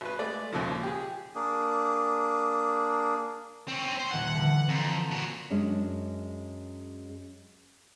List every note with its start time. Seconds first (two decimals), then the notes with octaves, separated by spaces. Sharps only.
0.01 G#1 B4
0.19 G#3 A3 D5
0.52 G#1 D#2 A#2 C#3 F3
0.83 G4 G#4
1.35 A#3 D4 G#4
3.68 C4 C#4
3.99 C5
4.11 D#1 D#3 F#5 G#6
4.35 D3 E3
4.68 F2 A#5 C6 G6
5.11 A#2 F#4
5.50 F#2 G#3 C#4 D4